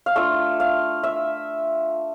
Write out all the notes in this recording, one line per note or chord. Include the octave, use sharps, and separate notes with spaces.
F5
A3 D4 F4 E5
F5
E5